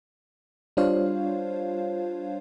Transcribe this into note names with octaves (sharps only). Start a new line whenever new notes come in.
G3 D4 F4 C5 C#5 F5